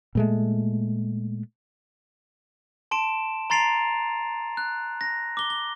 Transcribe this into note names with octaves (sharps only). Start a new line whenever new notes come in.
A#2 G#3 A3
A5 C6 D7 E7
A#5 C6 A6 C7 D7 F7
F#6
A#6
D6 G7
G7